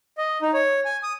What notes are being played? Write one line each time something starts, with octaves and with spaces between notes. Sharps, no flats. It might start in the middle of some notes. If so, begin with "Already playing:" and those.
D#5
D#4
C#5
G#5
D#6